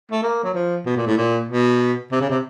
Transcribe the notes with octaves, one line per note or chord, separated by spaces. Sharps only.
A3
A#3
F#3
F3
B2
A#2
A2
A#2
B2
C3
C#3
C3